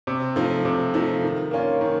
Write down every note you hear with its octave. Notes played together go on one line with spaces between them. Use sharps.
C3
F3 A3 D#4
C3
F3 A3 D#4
D#3
A#3 C#4 F4
D#3